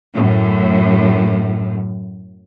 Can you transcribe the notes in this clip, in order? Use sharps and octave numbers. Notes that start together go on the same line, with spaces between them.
F#2 A2